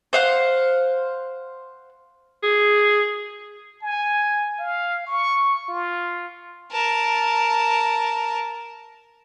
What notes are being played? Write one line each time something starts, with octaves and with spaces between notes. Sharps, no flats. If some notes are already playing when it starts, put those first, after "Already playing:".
C5 F5 F#5
G#4
G#5
F5
C#6
F4
A#4 A5